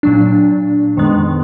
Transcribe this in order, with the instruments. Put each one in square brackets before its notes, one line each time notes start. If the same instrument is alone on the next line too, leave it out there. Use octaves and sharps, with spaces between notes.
[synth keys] A#2 F#3 D4
F2 D#3 G#3 B3